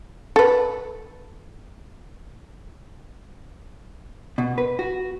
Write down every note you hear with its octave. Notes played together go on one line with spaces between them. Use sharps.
A4 B4
B2
B4
F#4